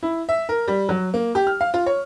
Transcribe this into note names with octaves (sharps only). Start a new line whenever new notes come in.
E4
E5
A#4
G3
F#3
A#3
G4
F6
F5
F4
C#5